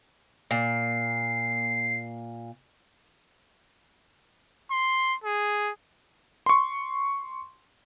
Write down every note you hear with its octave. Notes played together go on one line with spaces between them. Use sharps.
A#2 C7
C6
G#4
C6 C#6